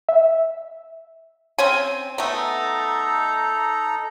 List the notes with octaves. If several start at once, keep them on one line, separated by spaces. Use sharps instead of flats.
E5
C4 C#4 G#5
A3 B3 D#4 A4 A#5